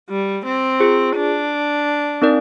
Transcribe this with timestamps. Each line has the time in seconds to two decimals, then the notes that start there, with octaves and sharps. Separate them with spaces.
0.09 G3
0.46 C4
0.80 F4 G#4 C5
1.16 D4
2.22 C4 D#4 A#4 D5